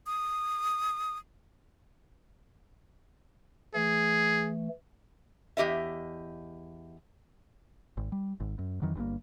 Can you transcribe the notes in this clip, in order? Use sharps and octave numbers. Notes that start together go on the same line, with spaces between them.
D#6
E3 A3 G#4
E2 G4 D#5 E5
G#1
G3
G#1
F#2
F2 D#3 E3 F#3
G1 G2 B2 A#3